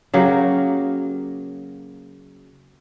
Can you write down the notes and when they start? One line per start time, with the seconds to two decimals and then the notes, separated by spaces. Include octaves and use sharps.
0.14 C#3 F#3 A#3 G4